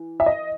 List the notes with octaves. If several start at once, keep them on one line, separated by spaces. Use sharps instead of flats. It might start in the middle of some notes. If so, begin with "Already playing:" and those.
Already playing: E3
E5
D#5